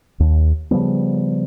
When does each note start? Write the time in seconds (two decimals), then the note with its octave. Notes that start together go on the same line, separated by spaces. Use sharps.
0.20 D#2
0.71 C#3 F3 G3 B3